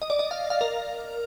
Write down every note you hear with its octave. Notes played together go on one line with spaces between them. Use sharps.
D#5
D5
D#5
F5
F5
A#4